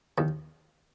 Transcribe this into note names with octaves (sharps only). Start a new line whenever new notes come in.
D#2 D#3